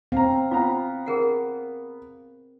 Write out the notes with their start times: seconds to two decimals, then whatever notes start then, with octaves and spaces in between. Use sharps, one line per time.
0.12 C4 F5 A#5
0.51 B3 F4 F5 A#5
1.06 G#4 A#4 F#5